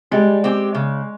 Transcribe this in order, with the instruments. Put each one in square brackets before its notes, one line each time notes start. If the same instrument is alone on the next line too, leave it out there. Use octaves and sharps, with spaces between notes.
[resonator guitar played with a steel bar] G3 [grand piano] G#3
[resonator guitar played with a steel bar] C4 G4
C#3